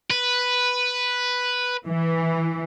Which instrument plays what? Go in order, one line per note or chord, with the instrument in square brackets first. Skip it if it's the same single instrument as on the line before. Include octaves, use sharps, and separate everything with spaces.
[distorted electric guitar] B4
[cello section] E3